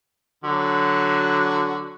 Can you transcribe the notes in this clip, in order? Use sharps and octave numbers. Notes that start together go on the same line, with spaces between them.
D3 F#3 F#4